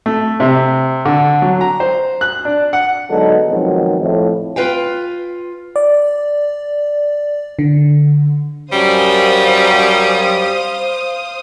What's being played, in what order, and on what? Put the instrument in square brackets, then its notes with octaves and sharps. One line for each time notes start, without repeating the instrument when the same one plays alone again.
[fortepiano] A3
C3
D3
F#3
A#5
C5
F#6
D4
F#5
[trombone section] D3 F#3 G#3 B3 D#4 A4
B2 D#3 F3 F#3 G#3 C4
F2 A2
[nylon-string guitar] F4 F#4 B4 F5 G5
[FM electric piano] D5
D3
[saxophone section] F#2 [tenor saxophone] G3 [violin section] C5 F5 D#6